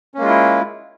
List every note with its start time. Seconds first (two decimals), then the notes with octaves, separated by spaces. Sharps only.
0.14 C#4
0.18 A#3
0.21 G#3
0.24 F4
0.28 E4